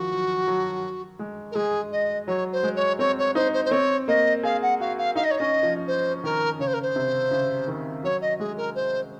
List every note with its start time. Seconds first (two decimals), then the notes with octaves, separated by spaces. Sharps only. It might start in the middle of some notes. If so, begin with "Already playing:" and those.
Already playing: D#3 F3 F#4
0.12 F#3
0.48 F#3
1.19 G#3
1.51 A#4
1.55 G#3 G#4
1.91 D#5
2.27 F#3 C#5
2.52 C5
2.63 G#3
2.76 C#5
2.99 C4 C#5
3.18 C#5
3.35 D#4 C5
3.53 C5
3.64 C5
3.71 C4 C#5
4.07 A#3 D#5
4.43 G#4 F5
4.62 F#5
4.80 F#4 F5
4.97 F5
5.15 D#4 F5
5.24 D#5
5.31 C#5
5.39 C#4 D#5
5.63 F3
5.87 C5
6.24 D#3 A#4
6.59 C#3 C#5
6.67 C5
6.73 A#4
6.82 C5
6.96 C3
7.31 C#3
7.68 D#3
8.03 F#3 C#5
8.21 D#5
8.39 G#3 G#4
8.57 A#4
8.75 C5